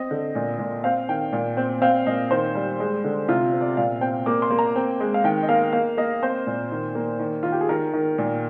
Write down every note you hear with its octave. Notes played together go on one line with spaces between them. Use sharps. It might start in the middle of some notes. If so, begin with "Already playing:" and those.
Already playing: C4 D#5
D3
A#2
A#2
C4 F5
D#3 G5
A#2
C4
C4 F5
A#2 D#5
D#3 C5
G3
G#3
D3
C3 F4
C4
D5
A#2 F5
C4 G5
A#3 D6
C6
A#3
A#5
C4 G5
G#3
F5
D#3 G5
D#5
A#3 F5
A#3 F5
A#3 D#5
C4 C5
A#2
D#3
A#3
D#3
D#3 F4
G4
G#4
D#3 A#4
D#3
A#2